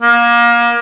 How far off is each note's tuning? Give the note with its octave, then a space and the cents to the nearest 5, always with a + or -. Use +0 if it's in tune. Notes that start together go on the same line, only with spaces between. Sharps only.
A#3 +25